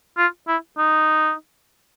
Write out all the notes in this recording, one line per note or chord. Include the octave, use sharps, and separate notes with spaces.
F4
E4
D#4